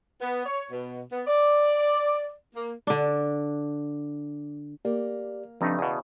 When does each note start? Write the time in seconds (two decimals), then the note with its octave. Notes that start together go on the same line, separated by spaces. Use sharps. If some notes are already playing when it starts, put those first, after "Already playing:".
0.21 B3
0.46 C#5
0.70 B2
1.12 B3
1.27 D5
2.56 A#3
2.87 D3 D4
4.85 A#3 G4 D5
5.61 G2 C#3 F3 A3 C4 D4 D#4
5.79 E2 B2 F5 D#6